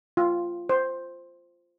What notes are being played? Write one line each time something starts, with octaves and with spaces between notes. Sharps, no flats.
F4
C5